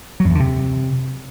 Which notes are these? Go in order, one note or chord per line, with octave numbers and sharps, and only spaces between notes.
F#3
F#2
E2
D3
C3